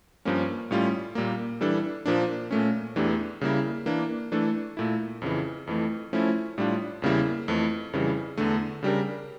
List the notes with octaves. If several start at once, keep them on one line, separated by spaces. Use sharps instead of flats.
G2 F3 A#3 C#4
A2 G3 C#4 F4
A#2 G3 A#3
E3 G3 D4 A4
A#2 F3 A#3 D4
A#2 A3 C#4
E2 E3 A3 D4 G4
C#3 G3 A#3 E4
E3 A#3 D4
E3 A3 D4 A4
A#2 A3 E4
F2 C#3 E3
F2 E3 A3
F3 A3 C#4 E4
A2 G3 D4 F4
E2 C#3 G3 A#3 E4
F2 E3 A3
F2 C#3 E3 G3
E2 D3 A3
C#3 G3 D4 G4 A#4